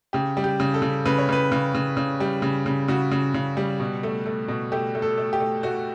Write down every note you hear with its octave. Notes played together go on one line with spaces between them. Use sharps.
C#3 G4
G3
G4
C#3
A4
C#3
C#3 B4
C#5
C#3 B4
C#3
C#3
C#3
G3
C#3
C#3
C#3 F#4
C#3
C#3
G3
B2
A3
A3
B2
A3 G4
A3
A4
A3
G4
A3
A3 F#4